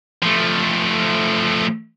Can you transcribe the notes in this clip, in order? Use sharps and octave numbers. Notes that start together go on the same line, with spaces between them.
F3 A3